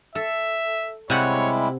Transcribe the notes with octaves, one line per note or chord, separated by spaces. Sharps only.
A4 E5
C3 G3 G#3 E4 C#5 F#5